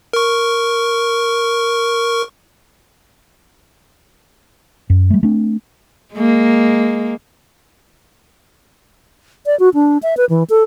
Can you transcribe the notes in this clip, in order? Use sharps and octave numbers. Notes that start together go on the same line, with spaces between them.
A#4 C#6
F#2
G3 A3
A3 C4 D4
G#3 A#3
D5
F#4
D4
E5
B4
E3
A4